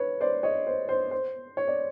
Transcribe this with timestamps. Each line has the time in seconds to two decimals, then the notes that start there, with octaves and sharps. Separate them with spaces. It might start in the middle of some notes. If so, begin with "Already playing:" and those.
Already playing: B4 C#5
0.21 C5 D5
0.43 C#5 D#5
0.67 C5
0.89 C5
1.11 C5
1.57 C#5
1.68 D5